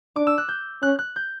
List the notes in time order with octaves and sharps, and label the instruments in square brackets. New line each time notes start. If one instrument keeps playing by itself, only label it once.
[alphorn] D4 [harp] D6
[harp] E6
F#6
G6
[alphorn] C#4 [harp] F#6
[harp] F#6
G6